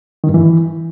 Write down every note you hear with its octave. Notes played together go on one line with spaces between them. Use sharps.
D#3
G2
E3